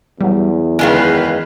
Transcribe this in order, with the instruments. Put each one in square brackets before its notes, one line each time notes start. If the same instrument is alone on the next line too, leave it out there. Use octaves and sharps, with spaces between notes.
[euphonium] E2 [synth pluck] F#3 G3
[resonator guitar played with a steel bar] F#2 D#3 G#3 [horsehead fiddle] B4 F5